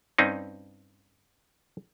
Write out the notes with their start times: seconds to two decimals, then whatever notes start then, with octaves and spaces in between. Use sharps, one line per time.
0.18 G2 C4 C#4 D#4